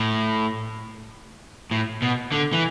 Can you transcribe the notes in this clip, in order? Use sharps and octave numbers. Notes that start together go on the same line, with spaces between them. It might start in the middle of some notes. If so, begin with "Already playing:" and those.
Already playing: A2
A2
B2
D3
E3